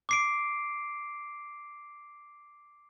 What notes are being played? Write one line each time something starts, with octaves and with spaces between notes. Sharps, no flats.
D6 C7 D7